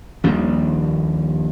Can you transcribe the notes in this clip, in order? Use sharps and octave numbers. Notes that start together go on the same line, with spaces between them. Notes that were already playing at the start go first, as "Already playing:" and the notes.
A#1 D#2 D#3 G3